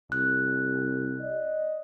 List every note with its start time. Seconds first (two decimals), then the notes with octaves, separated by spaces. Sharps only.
0.12 C2 F#6
1.20 D5 D#5